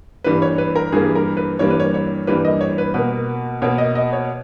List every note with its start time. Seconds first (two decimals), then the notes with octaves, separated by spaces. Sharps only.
0.24 G2 E3 G3 A#3 B4
0.42 C#5
0.58 B4
0.76 A#4
0.92 G2 E3 G3 A#3 G#4
1.15 A#4
1.37 B4
1.59 G2 E3 G3 A#3 C#5
1.70 B4
1.80 C#5
1.94 C#5
2.27 G2 E3 G3 A#3 B4
2.45 D#5
2.61 C#5
2.78 B4
2.94 B2 A#3 B4
3.62 B2 A#3 C#5
3.78 D#5
3.95 D#5
4.13 C#5